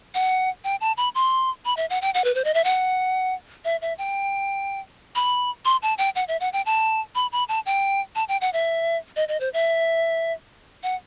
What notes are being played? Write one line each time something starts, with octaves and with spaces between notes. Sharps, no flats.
F#5
G5
A5
B5
C6
B5
E5
F#5
G5
F#5
B4
C5
D#5
E5
F#5
E5
E5
G5
B5
C6
A5
G5
F#5
E5
F#5
G5
A5
B5
B5
A5
G5
A5
G5
F#5
E5
D#5
D#5
C5
E5
F#5